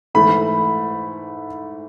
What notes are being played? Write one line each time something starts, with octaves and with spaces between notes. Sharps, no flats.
G#2 E3 A3 B5